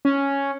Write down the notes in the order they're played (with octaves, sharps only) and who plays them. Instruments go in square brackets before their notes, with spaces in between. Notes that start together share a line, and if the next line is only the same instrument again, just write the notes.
[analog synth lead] C#4